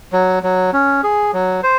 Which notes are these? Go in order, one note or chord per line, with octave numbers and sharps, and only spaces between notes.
F#3
F#3
C#4
G#4
F#3
C5